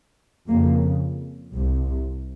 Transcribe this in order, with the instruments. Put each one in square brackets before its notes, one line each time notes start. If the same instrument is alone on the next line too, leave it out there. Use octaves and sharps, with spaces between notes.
[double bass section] F2 C#3 A#3
C2 C3